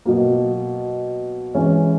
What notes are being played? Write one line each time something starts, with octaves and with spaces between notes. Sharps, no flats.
B2 F#3 A#3
E3 G#3 C#4